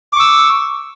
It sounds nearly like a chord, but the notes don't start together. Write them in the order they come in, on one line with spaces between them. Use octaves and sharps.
D6 C#6 E6